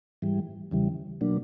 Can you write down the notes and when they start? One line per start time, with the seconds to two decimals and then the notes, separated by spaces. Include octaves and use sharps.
0.22 G#2 E3 G3
0.71 E2 C#3 E3 G3
1.21 B2 F#3 A#3 D4